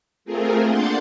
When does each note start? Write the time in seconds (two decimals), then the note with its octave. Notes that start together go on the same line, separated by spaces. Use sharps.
0.25 A3 C4 F4 G#4 A#4
0.67 A#3 D4 F#5 C6 G6 A6